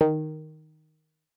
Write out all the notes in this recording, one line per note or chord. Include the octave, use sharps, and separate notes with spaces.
D#3